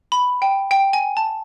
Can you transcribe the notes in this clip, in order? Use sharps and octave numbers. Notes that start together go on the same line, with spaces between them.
B5
G5
G5
G#5
A5